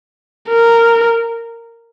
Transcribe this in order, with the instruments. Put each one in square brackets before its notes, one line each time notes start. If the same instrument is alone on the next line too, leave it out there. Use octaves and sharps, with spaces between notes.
[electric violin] A#4